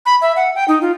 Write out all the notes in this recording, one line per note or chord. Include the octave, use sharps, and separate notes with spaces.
B5
E5
F#5
G5
D#4
F4